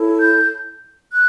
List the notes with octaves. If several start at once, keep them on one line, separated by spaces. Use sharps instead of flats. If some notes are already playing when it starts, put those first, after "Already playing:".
Already playing: E4 A4 C#5
G6
F#6